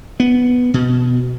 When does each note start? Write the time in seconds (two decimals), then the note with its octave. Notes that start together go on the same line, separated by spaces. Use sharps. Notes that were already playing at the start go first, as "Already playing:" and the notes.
0.20 B3
0.74 B2